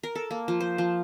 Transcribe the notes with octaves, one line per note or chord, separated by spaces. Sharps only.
A#4
A4
A#3
F3
C5
F3